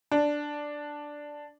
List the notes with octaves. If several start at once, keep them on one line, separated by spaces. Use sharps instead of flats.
D4